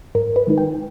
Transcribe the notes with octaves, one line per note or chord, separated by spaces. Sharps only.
G#2 A#4
B4
D#3 G#3 D#4
G5